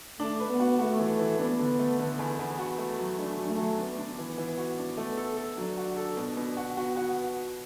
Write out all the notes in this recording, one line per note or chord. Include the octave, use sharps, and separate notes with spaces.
A3 D4
B4
B3
F#4
A3 F#4
E3
E3
B3 D4
D3
A3
D3 B3
E2
E2
F#4
A3
F#3
A3 D4
F#3
A3
F#3
B3 D4
D4
E3
E3
F#4
D4
A3
A4
A4
F#3 D4
F#4
A4
B2
B2
F#4
B3 F#4
F#4